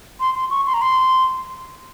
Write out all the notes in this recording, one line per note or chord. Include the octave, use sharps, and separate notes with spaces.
C6
C6
C#6
C6
A#5
C6